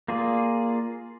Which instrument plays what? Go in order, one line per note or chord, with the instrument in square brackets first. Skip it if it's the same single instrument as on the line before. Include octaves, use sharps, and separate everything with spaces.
[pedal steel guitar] A#3 F4 G#4 D5